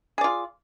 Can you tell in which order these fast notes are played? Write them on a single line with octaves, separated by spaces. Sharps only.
G#4 D5 F4